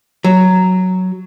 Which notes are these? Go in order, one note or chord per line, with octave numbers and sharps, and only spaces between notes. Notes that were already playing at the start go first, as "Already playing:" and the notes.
F#3